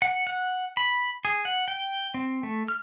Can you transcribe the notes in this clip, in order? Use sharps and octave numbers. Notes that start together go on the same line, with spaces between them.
F#5
F#5
B5
G#4
F#5
G5
C4
A3
F6